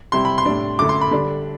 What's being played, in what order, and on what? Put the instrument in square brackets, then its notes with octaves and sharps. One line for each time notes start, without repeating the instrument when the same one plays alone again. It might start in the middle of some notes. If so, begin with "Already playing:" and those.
[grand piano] C3 G3 C4 E4 C6
B5
C6
A2 G3 D4
F#2 D3 A3 E4 D6
C6
B5
D3 G3 D4